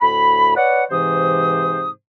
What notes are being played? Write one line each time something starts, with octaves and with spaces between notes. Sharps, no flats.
D2 A2 B5
B4 C#5 D5 F#5
G#2 C3 E3 C5 D#6